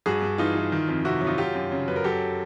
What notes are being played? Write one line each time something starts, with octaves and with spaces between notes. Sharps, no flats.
G2 F#4 G#4
G2
E3 D#4 F4
E3
D#3
F2
C3 E4 F#4
F#3
D#4 F4
F#3 F4 G4
F#2
C#3
F#2 B4
A#4
F#3 G4 A4